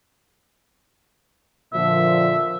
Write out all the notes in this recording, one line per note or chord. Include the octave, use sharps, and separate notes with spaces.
A#2 D3 F3 E5